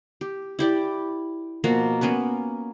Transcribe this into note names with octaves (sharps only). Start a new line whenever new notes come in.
G4
E4 G4 D5
B2 F3 A#3 F#4
A#3 B3 C#4 B4